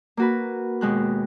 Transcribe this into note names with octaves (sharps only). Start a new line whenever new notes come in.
A#3 F#4 B4
D#2 B2 G#3 F#6